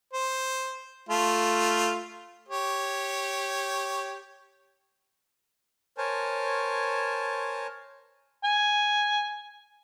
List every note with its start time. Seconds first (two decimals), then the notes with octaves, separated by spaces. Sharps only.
0.14 C5
1.09 A3 F4
2.49 G4 C#5
5.98 A#4 C5 C#5 G#5 A5
8.44 G#5